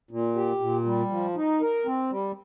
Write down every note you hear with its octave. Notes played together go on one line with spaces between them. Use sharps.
A#2
G4
A#2
G3
F3
D#4
A#4
C4
G3